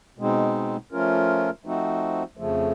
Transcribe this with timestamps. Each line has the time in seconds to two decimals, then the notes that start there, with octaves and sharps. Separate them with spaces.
0.19 B2 G#3 C4 D#4
0.92 F3 A3 C#4 F4 A#4
1.65 F3 A3 C4 D#4 F#4
2.37 F2 C#3 F3 A3